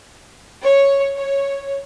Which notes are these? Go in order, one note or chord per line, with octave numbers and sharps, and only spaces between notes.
C#5
C#5